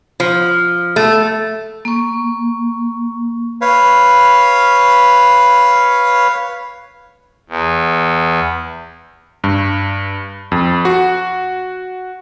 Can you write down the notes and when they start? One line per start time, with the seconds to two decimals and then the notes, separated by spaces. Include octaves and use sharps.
0.20 F3
0.96 A3
1.85 A#3 C#6
3.61 B4 C#5 F5
7.50 E2
9.44 G2
10.52 F2
10.85 F#4